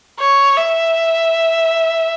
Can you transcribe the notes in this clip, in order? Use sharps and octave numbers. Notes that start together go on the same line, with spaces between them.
C#5
E5